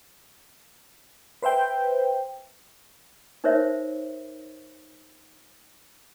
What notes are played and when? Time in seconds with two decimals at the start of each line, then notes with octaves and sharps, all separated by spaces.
1.42 B4 C5 E5 G5
3.44 D#4 A#4 C5 C#5 E5